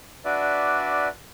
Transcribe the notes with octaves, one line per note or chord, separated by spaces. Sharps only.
D4 F#4 B4 D5 E5